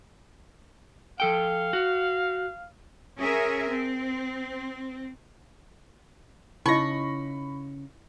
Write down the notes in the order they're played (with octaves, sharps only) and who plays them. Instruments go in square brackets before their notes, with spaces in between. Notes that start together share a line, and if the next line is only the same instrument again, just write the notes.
[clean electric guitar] F3 A4 G5 [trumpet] F5
[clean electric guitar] F#4
[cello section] C#4 G#4 A#4 E5
C4
[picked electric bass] C#3 [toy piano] D#4 E4 D#5 [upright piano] B5 A#6 [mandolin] C#6